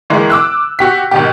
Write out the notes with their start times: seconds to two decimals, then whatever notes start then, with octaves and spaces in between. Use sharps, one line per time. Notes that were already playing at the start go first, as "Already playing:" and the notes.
0.10 A2 E3 G#3 A#3
0.30 D6 E6 F#6
0.79 F#4 G4 B6
1.11 G#1 B2 G4